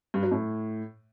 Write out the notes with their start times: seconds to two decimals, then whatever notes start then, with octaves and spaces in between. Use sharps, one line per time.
0.14 G2
0.23 F#3
0.31 A2